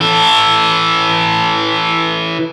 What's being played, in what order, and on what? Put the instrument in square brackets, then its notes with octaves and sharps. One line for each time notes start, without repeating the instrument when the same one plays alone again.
[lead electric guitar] E3 A4